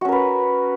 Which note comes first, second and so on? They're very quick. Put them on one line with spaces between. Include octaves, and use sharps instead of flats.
F#4 C#4 A#4 B4